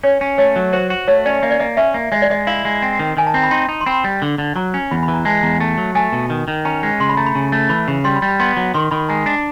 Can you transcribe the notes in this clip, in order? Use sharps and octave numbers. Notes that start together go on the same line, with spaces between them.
C#4 C#5
C#4
A3 C#5
F#3
F#4 C5
F#4
A3 C#5
C#4 D5
A#3 D#5
D5
A#3 D#5
C#4 E5
A#3
G#3 D#5
D5
G#3 D#5
E4 F5
G#3
C4
D#3
D#3 G#5
A5
C4 A#5
B5
D#4 C6
D#4
C6
C4 B5
G3
D3
D3
F#3 A#5
C#4
E2 B5
B5
E3
A#5
G#3 A5
E2 A#5
A3 A5
F#3
A3 G#5
B2
D#3
D#3
C#4 A#5
G#3
C#3 C6
B5
A3 A#5
B5
C#3
A3
E3 B5
C#3
G3 C6
B5
G3
B5
B3 C6
F#3
D#3 C6
D#3 B5
G#3 A#5
D4